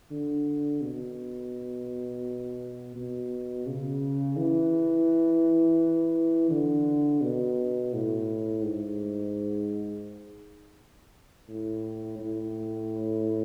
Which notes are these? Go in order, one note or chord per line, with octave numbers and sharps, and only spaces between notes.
D3
B2
B2
C#3
E3
D3
B2
A2
G#2
A2
A2